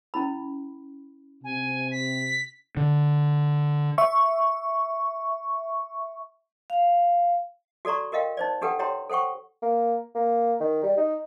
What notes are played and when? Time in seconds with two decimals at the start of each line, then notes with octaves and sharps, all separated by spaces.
0.14 C#4 E4 B5
1.44 C3 G#5
1.91 B6
2.77 D3
3.98 E5 C#6
6.70 F5
7.85 F#4 A4 D5 A#5 C#6
8.12 F#4 A#4 D#5 F5 G5
8.37 D#4 C5 D5
8.61 D4 G4 A4 B4 F#5 G5
8.79 E4 G4 C#5 G5 A#5 C6
9.10 A4 C5 F#5 G5 C#6
9.62 A#3
10.15 A#3
10.60 D#3
10.83 G3
10.97 D#4